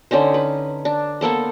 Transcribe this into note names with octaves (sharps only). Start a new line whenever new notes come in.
D3 C#4 D#4 C5
B4
D4
A#3 B3 A4 C5